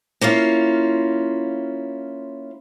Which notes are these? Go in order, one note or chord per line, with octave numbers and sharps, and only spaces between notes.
A#3 C#4 E4 F4